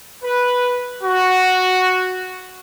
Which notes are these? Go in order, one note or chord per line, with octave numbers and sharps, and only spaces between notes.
B4
F#4